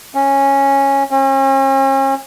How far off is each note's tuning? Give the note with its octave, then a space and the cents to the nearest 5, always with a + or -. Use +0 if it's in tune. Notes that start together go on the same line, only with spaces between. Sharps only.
C#4 -10
C#4 -40